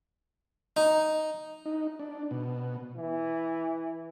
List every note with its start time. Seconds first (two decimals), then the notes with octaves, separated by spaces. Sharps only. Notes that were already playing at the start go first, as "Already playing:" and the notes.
0.77 D#4
1.65 D#4
1.99 D4
2.31 B2
2.97 E3